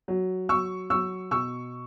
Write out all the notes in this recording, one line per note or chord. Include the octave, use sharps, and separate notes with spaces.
F#3
F#3 C#6 E6
F#3 C#6 E6
B2 C#6 E6